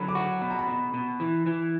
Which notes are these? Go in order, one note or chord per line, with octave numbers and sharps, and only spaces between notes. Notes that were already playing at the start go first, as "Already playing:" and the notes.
Already playing: D3 F#3 B5
D6
F#4 C#6
B2 B5
A#5
B5
B2
B2
E3
E3